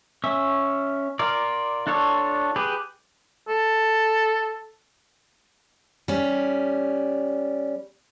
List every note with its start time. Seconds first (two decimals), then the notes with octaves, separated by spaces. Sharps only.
0.24 C#4 E5
1.19 F4 A#4 D5
1.87 D4 F4 A4 C#5
2.56 G4 G#4 B4
3.49 A4
6.08 G3 C#4